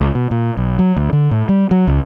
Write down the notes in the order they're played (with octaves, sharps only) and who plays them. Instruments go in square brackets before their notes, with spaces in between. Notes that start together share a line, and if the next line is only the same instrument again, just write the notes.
[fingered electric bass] C#2
B2
A#2
B1
F#3
D2
D3
A2
G3
F#3
C#2